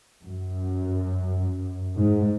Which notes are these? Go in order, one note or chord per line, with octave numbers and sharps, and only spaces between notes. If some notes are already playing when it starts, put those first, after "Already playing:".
F#2
G#2